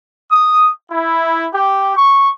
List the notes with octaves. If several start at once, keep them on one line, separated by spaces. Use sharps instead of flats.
D#6
E4
G4
C#6